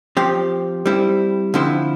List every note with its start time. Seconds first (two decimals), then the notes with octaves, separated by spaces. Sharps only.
0.17 F3 C4 G4
0.86 G3 C4 E4
1.54 D3 F3 C4 E4